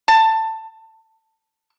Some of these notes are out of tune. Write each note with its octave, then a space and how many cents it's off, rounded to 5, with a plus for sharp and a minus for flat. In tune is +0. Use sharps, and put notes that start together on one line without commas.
A5 +15